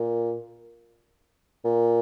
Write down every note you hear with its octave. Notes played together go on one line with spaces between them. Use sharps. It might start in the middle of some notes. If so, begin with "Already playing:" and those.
Already playing: A#2
A#2